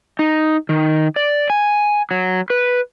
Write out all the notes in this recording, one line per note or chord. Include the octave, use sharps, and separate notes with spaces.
D#4
D#3
D5
G#5
F#3
B4